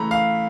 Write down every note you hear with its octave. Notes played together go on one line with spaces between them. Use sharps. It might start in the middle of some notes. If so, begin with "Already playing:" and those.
Already playing: C#3 E3 A3 A#5 B5
F5